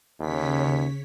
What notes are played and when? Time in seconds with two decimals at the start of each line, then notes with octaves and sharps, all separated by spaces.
0.20 D#2 C#3 C#5 B6